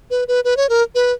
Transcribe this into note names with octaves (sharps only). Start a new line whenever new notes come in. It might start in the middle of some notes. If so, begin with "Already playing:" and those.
B4
B4
B4
C#5
A#4
B4